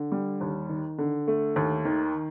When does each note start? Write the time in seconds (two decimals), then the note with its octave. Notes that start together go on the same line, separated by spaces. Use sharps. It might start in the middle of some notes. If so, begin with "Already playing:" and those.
Already playing: D3
0.12 G3
0.41 D#2
0.69 D#3
0.98 D3
1.28 A3
1.56 D#2
1.85 D#3